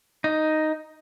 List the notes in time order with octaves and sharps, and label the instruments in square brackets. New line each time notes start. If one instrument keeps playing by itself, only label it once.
[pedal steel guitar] D#4